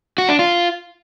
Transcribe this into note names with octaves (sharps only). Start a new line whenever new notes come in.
F#4
D4
F4